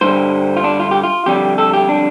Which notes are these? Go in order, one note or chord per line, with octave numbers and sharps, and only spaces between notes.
G2 D3 G3 C5
F4
D4
F4
G4
F4
F2 D3 G3 G4
A4
G4
D4